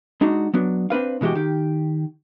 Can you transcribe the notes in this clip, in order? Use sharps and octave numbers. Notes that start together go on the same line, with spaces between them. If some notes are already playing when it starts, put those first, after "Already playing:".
G#3 D4 D#4 F#4
F#3 B3 D4
C4 D4 B4 F5
B2 E3 G#3 F#4 G4
D#3 G4